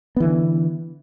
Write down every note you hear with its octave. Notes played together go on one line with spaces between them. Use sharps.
D3 E3 B3